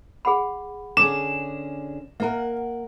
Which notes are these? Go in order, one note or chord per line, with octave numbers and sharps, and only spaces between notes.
G#4 F#5 B5
D3 C#4 G#4 A5 D6 E7
A#3 A#4 E5 F#5 A#5